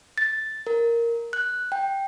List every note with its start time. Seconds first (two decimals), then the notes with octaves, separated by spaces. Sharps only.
0.18 A6
0.67 A#4
1.33 F#6
1.72 G5